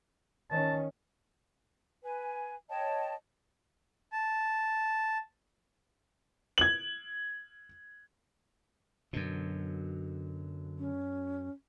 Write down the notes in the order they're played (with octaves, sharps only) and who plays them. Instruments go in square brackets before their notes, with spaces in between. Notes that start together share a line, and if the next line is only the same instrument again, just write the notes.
[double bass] D#3 C#4 [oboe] A5
[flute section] B4 G#5
C#5 D#5 G5 A5
[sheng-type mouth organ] A5
[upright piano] G#6 F#7
[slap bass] F#2 B2 [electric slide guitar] D3 F#3
[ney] C#4